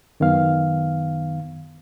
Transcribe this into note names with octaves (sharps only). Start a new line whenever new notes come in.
F#2 D#3 B3 F5